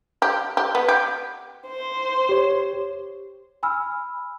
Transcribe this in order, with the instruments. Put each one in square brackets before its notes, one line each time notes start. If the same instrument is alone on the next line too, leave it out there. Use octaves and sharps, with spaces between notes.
[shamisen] G4
G4
B3
G4
[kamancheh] C5
[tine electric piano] G4 C#5
[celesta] G#5 B5 E6 F6